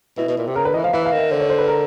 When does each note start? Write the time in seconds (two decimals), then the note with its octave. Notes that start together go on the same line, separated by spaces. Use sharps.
0.18 B2 E4
0.28 B2
0.38 A#2
0.47 C3
0.56 C#3 A#4
0.65 D3 B4
0.74 E3 D#5
0.83 F3 F5
0.93 E3 E5
1.06 F5
1.12 D#3
1.18 E5
1.31 D3 C5
1.40 C#5
1.50 C5
1.58 B4
1.68 A#4